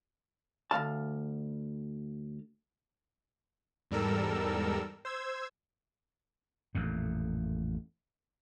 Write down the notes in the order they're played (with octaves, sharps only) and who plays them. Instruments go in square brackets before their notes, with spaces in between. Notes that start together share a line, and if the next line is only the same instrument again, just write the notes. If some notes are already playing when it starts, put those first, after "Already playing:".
[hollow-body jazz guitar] D2 G#2 F5 A5
[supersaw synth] E2 G#2 G3 A4 A#4 E6
C5 E6 G#6
[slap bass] A1 F2 A#2